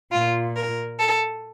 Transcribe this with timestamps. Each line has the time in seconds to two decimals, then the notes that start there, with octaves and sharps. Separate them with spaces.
0.12 A#2 F4
0.56 A#4
0.99 A4